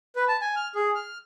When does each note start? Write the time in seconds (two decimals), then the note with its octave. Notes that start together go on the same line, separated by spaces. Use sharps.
0.16 B4
0.28 A5
0.41 G#5
0.56 F6
0.75 G#4
0.95 F6